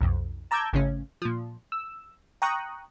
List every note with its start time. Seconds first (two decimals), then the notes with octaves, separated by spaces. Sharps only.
0.01 B1 F2
0.51 A5 A#5 D6 E6 G6 G#6
0.73 G#1 A2 C#3 C#4
1.22 A#2 F3
1.72 E6
2.42 G5 A#5 C#6 D#6 F#6